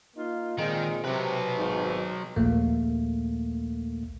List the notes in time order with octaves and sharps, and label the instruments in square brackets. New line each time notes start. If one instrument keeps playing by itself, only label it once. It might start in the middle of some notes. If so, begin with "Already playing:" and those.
[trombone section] A#3 D#4 F4
[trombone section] A#2 G#3 C4 [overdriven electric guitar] D#3
[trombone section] C3 [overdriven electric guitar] F#3 B4
[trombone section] G#1 G#2 D#3
[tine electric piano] A#1 D#2 A3 A#3